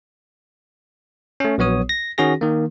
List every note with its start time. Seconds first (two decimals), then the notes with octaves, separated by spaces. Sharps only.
1.40 A3 C#4
1.58 A#1 F#3 B3 C#5 D#6
1.89 A#6
2.18 D#3 C#4 F#4 G#4 A#6
2.41 D#3 A#3